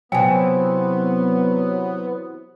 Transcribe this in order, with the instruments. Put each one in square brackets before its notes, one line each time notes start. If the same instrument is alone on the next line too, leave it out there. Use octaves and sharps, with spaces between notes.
[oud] C3 E3 [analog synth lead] F#3 [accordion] B3 [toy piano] G5 G#5